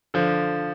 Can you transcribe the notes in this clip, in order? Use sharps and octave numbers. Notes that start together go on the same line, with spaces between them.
D3 F3